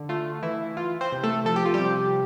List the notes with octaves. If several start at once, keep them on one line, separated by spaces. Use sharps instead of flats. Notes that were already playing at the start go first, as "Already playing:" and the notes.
Already playing: D3
A3 F4
E3 E4
E3 F4
C4 C5
C3
A3 A4
F3 A4
G4
F4
G3 G4
C3